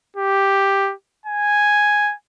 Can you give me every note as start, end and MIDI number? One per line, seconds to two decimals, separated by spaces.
0.16 0.94 67
1.26 2.14 80